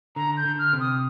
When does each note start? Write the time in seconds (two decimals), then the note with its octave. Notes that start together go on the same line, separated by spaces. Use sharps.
0.16 D3 A#5
0.37 G6
0.45 D3
0.59 F6
0.73 C3
0.80 D#6